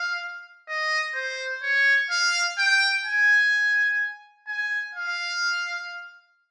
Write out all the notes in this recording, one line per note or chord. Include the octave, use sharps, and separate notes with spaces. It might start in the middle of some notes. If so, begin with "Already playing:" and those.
Already playing: F5
D#5
C5
C#5
F5
G5
G#5
G#5
F5